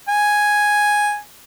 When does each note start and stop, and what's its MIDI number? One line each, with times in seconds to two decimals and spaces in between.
0.09 1.17 80